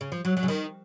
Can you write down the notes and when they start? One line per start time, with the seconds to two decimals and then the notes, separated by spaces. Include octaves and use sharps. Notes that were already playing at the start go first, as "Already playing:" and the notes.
0.01 C#3
0.12 F3
0.25 F#3
0.37 F#3
0.43 C#3
0.48 D#3